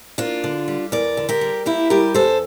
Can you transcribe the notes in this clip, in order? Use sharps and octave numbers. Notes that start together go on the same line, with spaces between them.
A#3 D4 F4
D3
G3
E2 A#4 D5
D3
G4 A#4
G3
A#3 E4 G4
G3 G4 A#4
E2 A4 C5